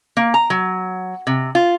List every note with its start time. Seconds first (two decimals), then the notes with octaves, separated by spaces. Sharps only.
0.17 A#3
0.34 A#5
0.50 F#3
1.27 C3
1.55 F4